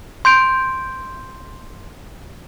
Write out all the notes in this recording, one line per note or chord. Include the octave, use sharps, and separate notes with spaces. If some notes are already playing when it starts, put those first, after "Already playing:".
C6 G6 D7